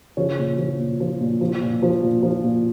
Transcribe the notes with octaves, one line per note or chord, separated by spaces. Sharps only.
C#3 F3 C#4
A#2
F3
A#2
F3
A#2
F3
A#2
F3
A#2
F3
A#2